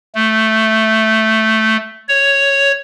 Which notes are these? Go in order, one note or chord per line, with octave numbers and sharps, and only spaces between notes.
A3
C#5